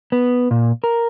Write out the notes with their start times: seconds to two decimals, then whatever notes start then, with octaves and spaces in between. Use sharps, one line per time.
0.12 B3
0.51 A#2
0.84 A#4